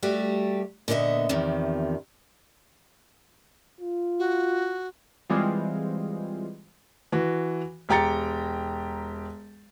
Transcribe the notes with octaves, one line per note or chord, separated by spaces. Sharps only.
G3 A3 F#4 G4
A#2 D3 B3 B4 D#5 E5
E2 C3 D#3 F3
F4
F#4
E3 G3 G#3 C4 F4
E3 F#4
E1 G4 G5 A#5 A6 C#7